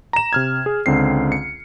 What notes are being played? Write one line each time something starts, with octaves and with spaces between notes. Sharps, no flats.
A#5 E7
C3 F6 G#6
G#4
C#2 D3 C4 C7
C#7